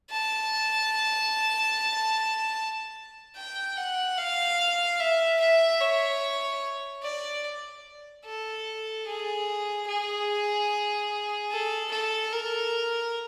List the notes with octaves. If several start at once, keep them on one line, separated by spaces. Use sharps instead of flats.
A5
G5
F#5
F5
E5
E5
C#5
D5
A4
G#4
G#4
A4
A4
A#4